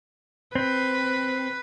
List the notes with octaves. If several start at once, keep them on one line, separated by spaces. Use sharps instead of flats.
C4 B4